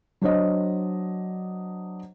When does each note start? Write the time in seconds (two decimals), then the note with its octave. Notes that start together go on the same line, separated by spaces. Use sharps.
0.21 F#3 D4 C5 C#5 D#5